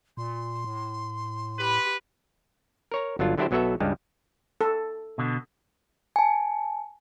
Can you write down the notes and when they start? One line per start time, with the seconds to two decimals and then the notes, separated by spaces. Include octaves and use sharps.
0.17 A#2 C6
0.64 A2
1.59 G4 B4 B5
2.92 A#4 C#5 A#5
3.19 G1 F#3 D4 F4
3.38 D3 F#3 D4 E4 G4 C5
3.51 B1 F#3 B3 F#4 A4 E5
3.80 C#2 G2 G3 G#3
4.61 A4
5.18 B2 D3
6.16 G#5 A5